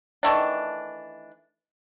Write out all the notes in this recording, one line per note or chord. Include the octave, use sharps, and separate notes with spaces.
D#3 E3 A3 D4